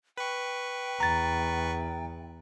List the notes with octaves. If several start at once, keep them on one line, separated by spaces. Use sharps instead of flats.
B4 G5 C#6
E2 A#5 A6